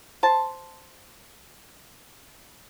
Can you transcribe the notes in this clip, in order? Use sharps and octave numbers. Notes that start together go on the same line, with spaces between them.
C5 A5